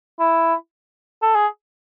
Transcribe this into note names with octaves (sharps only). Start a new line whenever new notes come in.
E4
A4
G#4